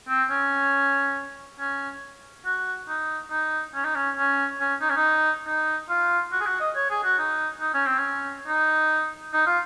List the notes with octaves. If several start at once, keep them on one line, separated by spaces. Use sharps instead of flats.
C4
C#4
C#4
F#4
D#4
D#4
C#4
D#4
C#4
C#4
C#4
D#4
C#4
D#4
D#4
F4
F#4
G#4
F#4
D#5
C#5
G#4
F#4
D#4
D#4
C#4
C4
C#4
D#4
D#4
F4